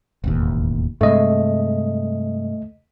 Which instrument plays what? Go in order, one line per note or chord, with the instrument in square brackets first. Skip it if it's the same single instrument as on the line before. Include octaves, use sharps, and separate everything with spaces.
[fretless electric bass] E1 A1 D#2
[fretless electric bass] G2 C3 G#3 [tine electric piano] A3 D#5